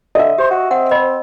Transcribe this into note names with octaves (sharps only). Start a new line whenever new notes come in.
D3 D#5 E5
G4 C5
F#4
C4 F#5
C5 D#5 B5